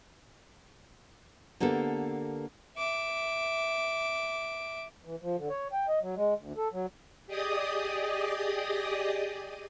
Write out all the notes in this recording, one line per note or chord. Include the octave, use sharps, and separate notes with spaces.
D3 A#3 B3 G4 A4
E5 D6
E3
F3
D3
C#5
G5
D#5
F#3
G#3
D2
A4
F#3
G4 G#4 D5 D#5 D#6